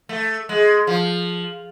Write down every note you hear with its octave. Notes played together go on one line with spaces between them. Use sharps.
A3
G#3
F3